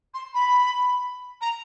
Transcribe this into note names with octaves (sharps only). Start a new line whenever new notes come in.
C6
B5
A#5